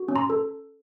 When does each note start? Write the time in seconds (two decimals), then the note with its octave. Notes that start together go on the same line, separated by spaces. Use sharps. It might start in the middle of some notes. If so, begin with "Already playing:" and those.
Already playing: F#4
0.08 C#4
0.16 A#5 C6
0.30 A4